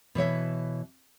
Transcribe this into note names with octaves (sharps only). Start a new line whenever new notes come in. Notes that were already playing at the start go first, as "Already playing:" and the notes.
B2 E3 C#5 E5